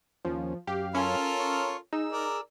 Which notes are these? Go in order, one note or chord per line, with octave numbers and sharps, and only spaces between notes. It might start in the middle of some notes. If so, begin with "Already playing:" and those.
D#2 F3 C#4
F#2 G4 F5
C#4 F4 A4 A#4
C#5 C#6
D#4 G#4 E6
A#4 D5